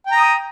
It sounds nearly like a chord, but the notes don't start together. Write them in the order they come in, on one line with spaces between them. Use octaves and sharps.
G5 A#5 D#6